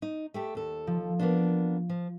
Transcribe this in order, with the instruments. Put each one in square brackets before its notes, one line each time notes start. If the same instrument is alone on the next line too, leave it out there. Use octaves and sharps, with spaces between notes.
[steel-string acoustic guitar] D#4
A3 G4 A4
D#2 A4
[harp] F3
[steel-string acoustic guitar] A#3 B3 D4
F3